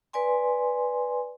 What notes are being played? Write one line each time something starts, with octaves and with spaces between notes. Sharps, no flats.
B4 D5 G#5 C6